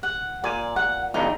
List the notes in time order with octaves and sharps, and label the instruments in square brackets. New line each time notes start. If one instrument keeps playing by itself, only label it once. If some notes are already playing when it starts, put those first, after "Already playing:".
[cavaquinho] F#5
[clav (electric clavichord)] A#2 G#5 [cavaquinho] D5
[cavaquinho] F#5
[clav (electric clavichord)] B1 E2 G2 [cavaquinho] D#4